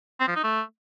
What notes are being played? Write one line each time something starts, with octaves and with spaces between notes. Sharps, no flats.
C4
F3
D#4
A3